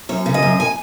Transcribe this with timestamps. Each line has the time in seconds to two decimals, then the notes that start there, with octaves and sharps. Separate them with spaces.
0.09 F#2 C#5
0.26 C#3
0.34 D#5
0.43 F#2
0.60 G#5